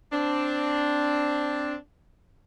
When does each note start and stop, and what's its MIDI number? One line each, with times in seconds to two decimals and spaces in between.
0.12 1.75 60
0.12 1.75 62